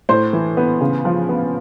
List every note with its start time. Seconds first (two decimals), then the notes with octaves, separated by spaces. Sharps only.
0.09 A2 C5
0.33 E3
0.57 B3
0.81 C#3
1.05 F3
1.29 B3